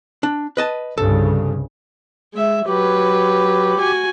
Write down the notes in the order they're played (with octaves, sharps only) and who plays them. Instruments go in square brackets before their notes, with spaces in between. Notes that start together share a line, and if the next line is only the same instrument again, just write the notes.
[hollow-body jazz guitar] D4
B4 D#5 A5
[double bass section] C2 G2 C#3 [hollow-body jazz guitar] A4
[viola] G#3 E5
[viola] F#3 B4 [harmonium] G4
[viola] F#4 G#5